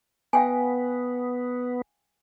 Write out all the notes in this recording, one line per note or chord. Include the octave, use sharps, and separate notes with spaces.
B3 F5 G5 G#5